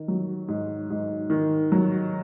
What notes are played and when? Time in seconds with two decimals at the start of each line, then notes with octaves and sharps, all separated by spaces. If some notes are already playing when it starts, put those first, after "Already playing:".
Already playing: D#3
0.08 F#3
0.48 G#2
0.90 G#2
1.30 D#3
1.72 F#3